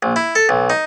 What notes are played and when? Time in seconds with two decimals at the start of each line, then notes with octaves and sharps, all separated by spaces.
0.03 A#1
0.16 E4
0.35 A4
0.49 B1
0.70 D#4